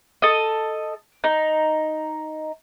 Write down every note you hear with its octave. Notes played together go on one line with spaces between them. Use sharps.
A4 D#5
D#4